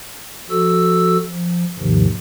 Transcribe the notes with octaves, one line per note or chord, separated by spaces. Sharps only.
F3 F#4 A4 E6
F3
D#2 G#2 C3 D#3 F3